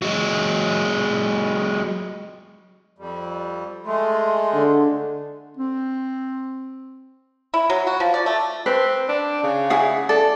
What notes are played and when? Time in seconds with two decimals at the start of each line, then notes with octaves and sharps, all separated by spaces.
0.02 F#3 G#3
2.98 F2 G3
3.86 G#3 A3 C6
4.53 D3
5.57 C4
7.54 E4
7.70 F#3
7.87 F#4
8.00 F3
8.14 D5
8.26 A3
8.66 C4 B4
9.09 D4
9.44 C#3
9.70 E4 G#4 F#5
10.09 A4 D5